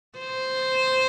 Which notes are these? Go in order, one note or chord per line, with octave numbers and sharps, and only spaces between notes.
C5